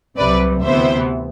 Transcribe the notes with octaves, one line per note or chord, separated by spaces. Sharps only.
C2 C3 F#3 B4 D5
D2 C3 E3 B3 C5 E5